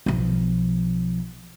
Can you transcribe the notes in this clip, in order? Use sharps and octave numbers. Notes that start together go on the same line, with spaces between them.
B1 F3